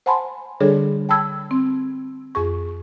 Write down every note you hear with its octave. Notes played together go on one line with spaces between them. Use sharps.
C5 F#5 G#5 A5 B5 C6
D3 G3 D4 G#4 A4 C#5
G5 A5 B5 E6 G#6
C4
F2 G#4 C#6